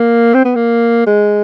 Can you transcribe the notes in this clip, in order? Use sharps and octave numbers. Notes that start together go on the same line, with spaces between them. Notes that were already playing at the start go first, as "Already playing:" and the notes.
Already playing: A#3
C4
B3
A#3
G#3